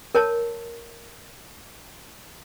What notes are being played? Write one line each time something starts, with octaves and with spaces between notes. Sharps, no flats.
A#4 C#5 A5